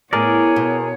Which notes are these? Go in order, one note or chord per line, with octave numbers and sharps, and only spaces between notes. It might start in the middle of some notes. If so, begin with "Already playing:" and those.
A2 B3 G#4 A#4 C#5 D5
B2